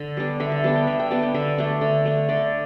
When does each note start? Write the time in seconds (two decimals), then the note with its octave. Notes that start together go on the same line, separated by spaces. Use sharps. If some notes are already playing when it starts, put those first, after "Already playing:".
Already playing: D3
0.17 G3 B3 D4
0.40 D3 E5
0.52 E5
0.64 G3 B3 D4 A5
0.76 G5
0.87 D3 E5
1.00 G5
1.11 G3 B3 D4 A5
1.23 G5
1.34 D3 E5
1.58 A3 D4
1.81 D3
2.05 A3 D4
2.29 D3 D5